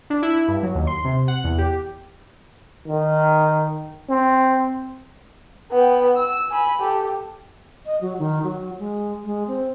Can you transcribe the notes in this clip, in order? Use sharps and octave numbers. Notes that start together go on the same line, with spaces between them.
D4
E4
G2
F#3
D#2
C6
C3
F#5
E2
G4
D#3
C4
B3 G5
E6
G#5 B5
G4 A4
D#5
F#3
D#3
F#3
G#3
G#3
C4